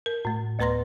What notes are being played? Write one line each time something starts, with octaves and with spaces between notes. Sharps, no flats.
A#4
A2 A3
D2 A3 B4 A#5 C6 A#6